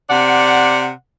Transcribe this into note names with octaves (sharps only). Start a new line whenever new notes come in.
C3 D5 F#5